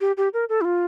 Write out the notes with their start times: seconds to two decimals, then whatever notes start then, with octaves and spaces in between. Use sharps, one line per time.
0.01 G4
0.17 G4
0.34 A#4
0.49 A4
0.61 E4
0.65 F4